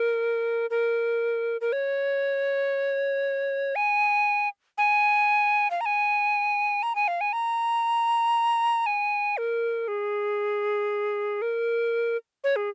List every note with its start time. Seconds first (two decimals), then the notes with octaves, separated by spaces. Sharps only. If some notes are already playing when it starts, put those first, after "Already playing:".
Already playing: A#4
0.70 A#4
1.61 A#4
1.72 C#5
3.76 G#5
4.78 G#5
5.71 F5
5.81 A#5
5.86 G#5
6.83 A#5
6.96 G#5
7.08 F5
7.21 G#5
7.33 A#5
8.86 G#5
9.37 A#4
9.88 G#4
11.42 A#4
12.44 C#5
12.56 G#4